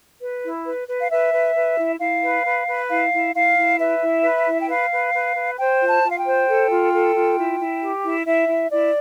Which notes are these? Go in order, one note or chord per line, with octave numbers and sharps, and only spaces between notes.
B4
E4
B4
B4
F5
B4 E5
B4
B4
E4
E4 F5
B4
B4
B4
E4 F5
E4
E4 F5
E4
B4 E5
E4
B4
E4
G5
B4 F5
B4
B4
B4
C5 G5
F4
A5
F4
F5
G5
C5
A4
F4
A4
F4
E4
E4
G4
E4
E4 E5
E4
E4 D5